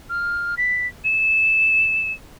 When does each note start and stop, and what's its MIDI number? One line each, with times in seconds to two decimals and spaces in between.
0.10 0.55 89
0.57 0.87 95
1.04 2.12 100